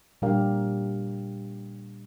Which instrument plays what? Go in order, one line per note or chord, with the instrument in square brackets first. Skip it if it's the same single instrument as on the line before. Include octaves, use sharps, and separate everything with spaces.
[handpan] A#2 G3 D4 G4 A#4 F5